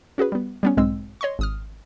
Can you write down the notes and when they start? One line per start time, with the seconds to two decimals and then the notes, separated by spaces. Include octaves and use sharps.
0.18 C#4 F#4 G#4 B4
0.32 G3 B3
0.63 G3 B3 C#4
0.77 B1 G#2 G#3 C4 E6
1.21 C#5 D#5 C6 C#6
1.39 G#1 D#6 F6